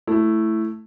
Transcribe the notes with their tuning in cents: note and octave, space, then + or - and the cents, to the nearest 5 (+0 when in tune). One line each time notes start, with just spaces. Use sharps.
A3 +0 E4 +5